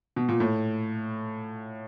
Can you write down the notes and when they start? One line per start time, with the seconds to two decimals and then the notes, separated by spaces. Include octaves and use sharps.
0.16 B2
0.29 A#2
0.40 A2